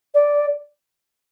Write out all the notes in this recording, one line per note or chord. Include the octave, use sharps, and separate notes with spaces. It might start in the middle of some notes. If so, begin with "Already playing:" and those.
D5